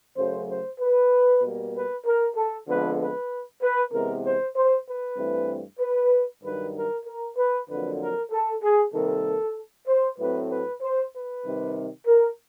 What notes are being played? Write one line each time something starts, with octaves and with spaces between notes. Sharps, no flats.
F#2 C#3 F#3 A3 C5
C5
B4
B2 G3 A#3
B4
A#4
A4
F2 D3 F3 G#3 B3 B4
B4
B4
C3 E3 G#3 B3 A#4
C5
C5
B4
G2 E3 A3 C4
B4
G2 D#3 F#3 B4
A#4
A#4
B4
F2 D3 F#3 A#3 B4
A#4
A4
G#4
C3 D#3 G3 A#3 A4
C5
A2 F#3 A3 C4 B4
B4
C5
B4
C3 D#3 G3
A#4